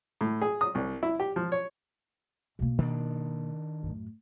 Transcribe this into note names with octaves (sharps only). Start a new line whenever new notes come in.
A2
G#4
D#6
C2
E4
G4
F3
C#5
B2 A#3
D#3 D4
F#2 A2